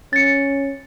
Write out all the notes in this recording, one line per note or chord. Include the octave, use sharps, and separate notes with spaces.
C#4 A6 C#7